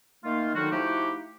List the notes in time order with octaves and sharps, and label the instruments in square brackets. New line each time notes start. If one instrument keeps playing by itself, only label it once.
[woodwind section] D#3 A3 A#3 D#4 F4
D3 D#3 F#3 D#4 F4 F#4
F3 A3 D#4 E4 F#4 G4